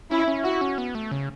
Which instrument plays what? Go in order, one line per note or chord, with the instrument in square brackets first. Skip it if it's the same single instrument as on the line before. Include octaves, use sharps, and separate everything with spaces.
[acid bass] C#4 [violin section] E4
[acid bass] C#4
[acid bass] E4 [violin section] F#4
[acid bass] C#4
B3
A3
C#3